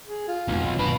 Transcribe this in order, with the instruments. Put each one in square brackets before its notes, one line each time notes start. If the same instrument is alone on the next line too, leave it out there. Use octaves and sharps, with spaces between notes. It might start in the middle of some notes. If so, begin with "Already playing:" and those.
[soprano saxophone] G#4
F4
[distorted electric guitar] B1 [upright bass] F2 E3
[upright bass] G2 D#3 [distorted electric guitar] B2 B4 [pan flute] B5